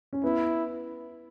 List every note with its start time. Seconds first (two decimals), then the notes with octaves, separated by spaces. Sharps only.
0.13 C#4
0.23 B3 E4